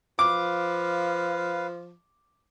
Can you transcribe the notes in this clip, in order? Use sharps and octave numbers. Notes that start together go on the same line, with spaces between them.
F3 B4 F5 D6